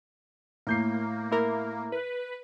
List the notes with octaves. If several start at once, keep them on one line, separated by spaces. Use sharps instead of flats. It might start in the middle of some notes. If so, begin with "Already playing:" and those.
A2 A#3 G6 C7
E4 A#4
B4